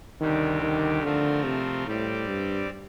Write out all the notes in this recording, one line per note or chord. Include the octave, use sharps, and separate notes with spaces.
D2 C3 D#3 G3 D4 G4
D#3
D3 F3 A3 C4 F4 A#4
C3
A2 G3 C4 G4 D5
G2